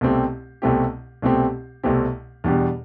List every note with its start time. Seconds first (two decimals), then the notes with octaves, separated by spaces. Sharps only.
0.01 C2 B2 A3 C4 G4
0.62 C2 B2 A3 C4 G4
1.22 C2 B2 A3 C4 G4
1.83 C2 B2 A3 C4 G4
2.44 E2 B2 G3 D4 G4